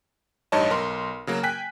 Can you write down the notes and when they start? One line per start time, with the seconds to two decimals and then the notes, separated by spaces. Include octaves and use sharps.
0.52 A1 G2 D#4 C#5 D#5 A5
0.70 B1 A#4 C6
1.27 C#3 F#3 A#3
1.43 G5 G#5 F#6 B6